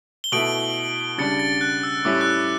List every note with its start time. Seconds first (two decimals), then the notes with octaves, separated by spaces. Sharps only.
0.24 G7
0.32 B2 A3 E4 D7 F#7
1.18 C#3 G3 D4 A6 C#7
1.39 A6
1.61 F#6
1.83 E6
2.05 A2 G3 C#4 E4 D6
2.21 F#6
2.26 E6